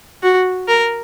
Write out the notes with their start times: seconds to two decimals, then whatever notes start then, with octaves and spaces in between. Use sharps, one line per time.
0.23 F#4
0.68 A#4